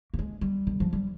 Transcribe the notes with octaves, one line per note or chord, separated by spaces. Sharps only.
A#3
G#3
G3
D#3
F3
G3